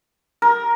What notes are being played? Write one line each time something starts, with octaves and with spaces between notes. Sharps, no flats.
A#4